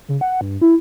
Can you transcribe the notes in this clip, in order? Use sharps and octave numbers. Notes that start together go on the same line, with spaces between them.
C#3
F#5
G2
E4